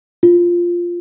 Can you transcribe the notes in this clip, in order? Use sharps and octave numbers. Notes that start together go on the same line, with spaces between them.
F4